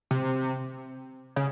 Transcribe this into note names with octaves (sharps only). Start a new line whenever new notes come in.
C3
C#3